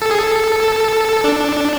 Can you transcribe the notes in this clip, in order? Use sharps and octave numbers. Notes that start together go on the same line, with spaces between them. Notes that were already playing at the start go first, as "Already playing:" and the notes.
A4
G#4
A4
D4